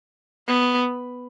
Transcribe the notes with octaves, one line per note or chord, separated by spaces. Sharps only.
B3